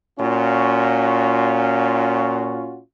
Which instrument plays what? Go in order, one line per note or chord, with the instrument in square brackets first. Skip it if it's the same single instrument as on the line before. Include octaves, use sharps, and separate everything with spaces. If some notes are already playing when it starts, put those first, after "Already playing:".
[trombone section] A#2 C#4 F4 F#4